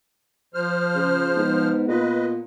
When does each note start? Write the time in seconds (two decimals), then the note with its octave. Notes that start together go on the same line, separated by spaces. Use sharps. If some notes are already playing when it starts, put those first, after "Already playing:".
0.54 F3 C5 F6
0.94 C#3
1.37 G#2 B3
1.88 A#2 B4 D#5